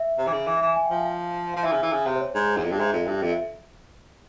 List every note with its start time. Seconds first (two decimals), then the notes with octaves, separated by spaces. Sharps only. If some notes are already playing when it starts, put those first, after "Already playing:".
Already playing: E5
0.18 C3
0.27 E3
0.33 C#3
0.47 E3 E5
0.57 E5
0.62 E3 G#5
0.76 G#5
0.86 G5
0.91 F3 F5
0.96 E5
1.05 F5
1.54 F3 F5
1.63 E3 E5
1.72 C#3
1.82 E3
1.92 C#3
2.07 C3
2.16 C5
2.21 C#5
2.35 G#2
2.57 E2
2.64 F2
2.71 G2
2.79 G#2 E5
2.93 F2
3.07 G2
3.22 F2
3.31 E5